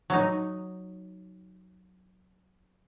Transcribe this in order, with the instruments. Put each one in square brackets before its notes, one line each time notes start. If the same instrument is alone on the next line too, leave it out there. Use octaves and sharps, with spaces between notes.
[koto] F#3 D#4